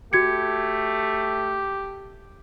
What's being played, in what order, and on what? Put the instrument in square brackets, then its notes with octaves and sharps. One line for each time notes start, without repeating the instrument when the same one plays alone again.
[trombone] A3 [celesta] F#4 G#6 C#7 [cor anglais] G4